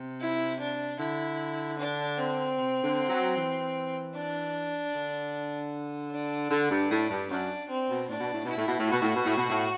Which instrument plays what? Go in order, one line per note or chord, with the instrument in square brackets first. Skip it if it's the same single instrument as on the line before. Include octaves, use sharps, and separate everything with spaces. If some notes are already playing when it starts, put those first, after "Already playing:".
Already playing: [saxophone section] C3
[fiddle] E4
D4
[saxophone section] D3 [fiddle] E4
[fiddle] D4
C4
[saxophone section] C3
D3
F#3
E3
[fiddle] D4
[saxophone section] D3
[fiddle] D4
[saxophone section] D3
G2
A2
G2
[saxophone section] F#2 [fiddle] D4
[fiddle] C4
[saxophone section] B2
[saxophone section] A2 [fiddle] D4
[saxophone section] B2
A2
[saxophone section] B2 [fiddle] E4
[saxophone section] A2
B2
A2
[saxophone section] B2 [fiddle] F#4
[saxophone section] A2
B2
A2
B2
A2